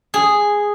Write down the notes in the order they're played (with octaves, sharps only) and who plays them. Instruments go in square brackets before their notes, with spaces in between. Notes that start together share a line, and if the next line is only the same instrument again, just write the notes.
[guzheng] G#4